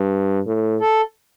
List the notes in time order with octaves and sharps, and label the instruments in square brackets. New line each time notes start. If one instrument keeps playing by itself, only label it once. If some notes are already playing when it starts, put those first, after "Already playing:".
Already playing: [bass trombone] G2
A2
[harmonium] A4